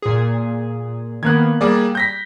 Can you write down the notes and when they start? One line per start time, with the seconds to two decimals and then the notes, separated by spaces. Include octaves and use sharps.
0.02 A#2 G#4
1.23 D#3 A#3 B3 F#6 G#6
1.61 G3 A#3 G#4 D5
1.95 G6 A#6 B6